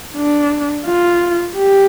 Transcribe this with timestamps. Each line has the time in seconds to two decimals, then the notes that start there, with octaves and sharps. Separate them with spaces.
0.16 D4
0.86 F4
1.56 G4